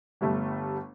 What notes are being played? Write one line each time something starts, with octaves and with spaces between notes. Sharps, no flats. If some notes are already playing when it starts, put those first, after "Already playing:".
G1 G3 A3